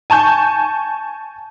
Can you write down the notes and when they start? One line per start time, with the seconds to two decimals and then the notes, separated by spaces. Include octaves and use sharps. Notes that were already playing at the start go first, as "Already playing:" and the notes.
0.10 G#5 A5 C#6 G6